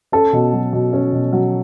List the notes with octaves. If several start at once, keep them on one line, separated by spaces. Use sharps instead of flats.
C#4 A4
B2
F#3
B2
C#4
B2
F#3